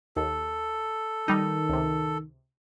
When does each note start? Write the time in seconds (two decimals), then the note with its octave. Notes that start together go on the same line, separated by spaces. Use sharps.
0.16 D#2 A4
1.28 D#3 G3 D#4
1.69 C#2 C3